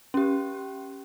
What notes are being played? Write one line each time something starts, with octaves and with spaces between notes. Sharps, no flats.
C#4 G4